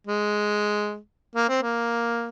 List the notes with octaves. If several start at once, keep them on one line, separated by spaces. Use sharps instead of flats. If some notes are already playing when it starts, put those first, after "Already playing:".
G#3
A#3
C4
A#3